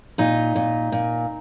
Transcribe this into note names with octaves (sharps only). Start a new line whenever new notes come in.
A#2 D#4
A#2
A#2